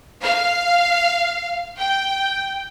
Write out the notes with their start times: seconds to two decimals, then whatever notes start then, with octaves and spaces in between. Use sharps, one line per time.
0.20 F5
1.78 G5